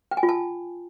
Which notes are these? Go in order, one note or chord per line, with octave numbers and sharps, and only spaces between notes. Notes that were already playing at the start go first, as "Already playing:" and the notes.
G5
G#5
F4
A5